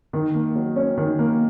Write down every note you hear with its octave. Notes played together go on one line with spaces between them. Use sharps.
D#3
A#3
F#3
C#4
D#3
A#3